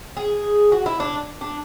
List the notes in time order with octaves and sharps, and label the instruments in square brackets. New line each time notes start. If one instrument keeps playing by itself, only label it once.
[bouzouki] G#4
F#4
E4
D4
D4